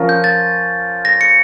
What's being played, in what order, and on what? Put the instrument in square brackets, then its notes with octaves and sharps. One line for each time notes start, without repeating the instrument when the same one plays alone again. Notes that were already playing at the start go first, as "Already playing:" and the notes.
Already playing: [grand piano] F3 C#4 F4 A#4
[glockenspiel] G6
A6
A#6
C#7